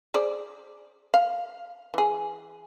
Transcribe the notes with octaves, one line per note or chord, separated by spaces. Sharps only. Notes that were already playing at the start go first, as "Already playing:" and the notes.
G#4 C5 D5
F5
E3 G#4